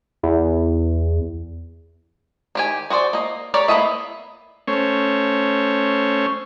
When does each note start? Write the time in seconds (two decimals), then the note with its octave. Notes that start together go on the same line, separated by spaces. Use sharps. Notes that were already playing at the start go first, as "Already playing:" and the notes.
0.23 E2
2.55 D#3 G4 G#5
2.90 F#4 G#4 C5 D5
3.13 A#3 D#5
3.54 G4 A#4 C#5 D5
3.68 A#3 B3 A4 D#5 E5
4.68 A3 C#4 C5 C#5